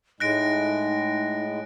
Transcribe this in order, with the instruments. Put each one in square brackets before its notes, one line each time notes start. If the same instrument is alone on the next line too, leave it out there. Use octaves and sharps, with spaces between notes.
[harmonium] A2 G#3 [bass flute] D#4 [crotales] F#6 A#6 D7